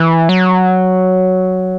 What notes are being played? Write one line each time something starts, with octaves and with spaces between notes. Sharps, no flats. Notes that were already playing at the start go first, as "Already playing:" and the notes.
Already playing: E3
F#3